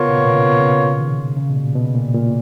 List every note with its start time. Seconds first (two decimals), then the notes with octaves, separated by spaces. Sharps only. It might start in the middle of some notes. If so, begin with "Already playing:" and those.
Already playing: C#3 B3 F4 A#4 C#5
0.09 B2
0.18 A#2
0.26 B2
0.34 C#3
0.60 C#3
0.99 D#3
1.36 C#3
1.50 B2
1.56 A#2
1.76 B2
1.94 A#2
2.14 A#2